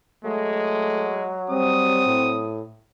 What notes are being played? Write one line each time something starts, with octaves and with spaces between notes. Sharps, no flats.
F#3 G#3 A3
G3 C4 D#6
A2